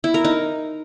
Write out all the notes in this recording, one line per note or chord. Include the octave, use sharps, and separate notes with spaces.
E4
A#4
D#4